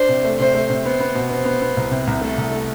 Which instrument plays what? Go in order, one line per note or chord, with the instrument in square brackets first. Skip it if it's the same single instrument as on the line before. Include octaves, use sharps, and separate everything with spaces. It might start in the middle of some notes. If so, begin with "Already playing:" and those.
Already playing: [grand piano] D4 [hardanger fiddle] C5
[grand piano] C3
A3
[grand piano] C3 [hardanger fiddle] C5
[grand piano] A3
C3
[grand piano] B3 [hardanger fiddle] C5
[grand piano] B3
B2
[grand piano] B3 [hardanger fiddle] C5
[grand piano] B3
B3
C2
C3
C2
[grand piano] A3 [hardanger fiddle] A4
[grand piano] C2
A3